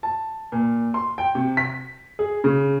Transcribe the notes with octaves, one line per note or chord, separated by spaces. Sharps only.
A5
A#2
C6
G5
C3
B6
G#4
C#3